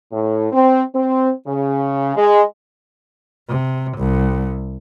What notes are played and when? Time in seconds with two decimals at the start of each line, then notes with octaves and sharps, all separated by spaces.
0.12 A2
0.52 C4
0.95 C4
1.47 C#3
2.16 G#3
3.48 C3
3.98 C2